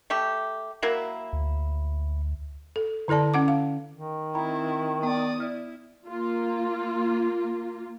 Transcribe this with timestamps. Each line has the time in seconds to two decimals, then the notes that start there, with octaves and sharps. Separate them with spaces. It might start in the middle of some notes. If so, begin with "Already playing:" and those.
0.10 A3 G4
0.83 F#3 A#3 E4
1.33 D2
2.76 A4
3.08 D3 E4 A4 D5 A5
3.34 C#4 F#5 D6
3.48 F5
3.92 D#3
4.35 C4 E4 G5 A#5 B5
5.03 B3 D5 G5 D#6
5.40 E4 D5 F6
6.06 A#3 F4